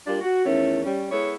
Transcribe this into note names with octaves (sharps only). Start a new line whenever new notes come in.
G3 A#3 D4 F4 D5
F#4
E2 D#3 A3 C#4 E4
G3 C#4
G#3 B3 E4 A4 C#5